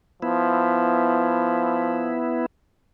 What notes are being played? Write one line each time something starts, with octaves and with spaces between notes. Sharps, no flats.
F3 B3 E4